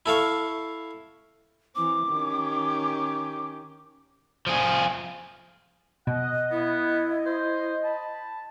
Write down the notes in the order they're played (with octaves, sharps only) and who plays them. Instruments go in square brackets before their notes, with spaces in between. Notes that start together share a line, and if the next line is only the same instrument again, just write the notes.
[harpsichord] E4 A4 F5 C#6
[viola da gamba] E3 C4 [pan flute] D6
[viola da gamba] D#3 C#4 G4
[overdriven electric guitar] F3 G#4
[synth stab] B2 [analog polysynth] D#5 [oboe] F#5
[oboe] B3 [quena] E4
[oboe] C5
[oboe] A5 [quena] B5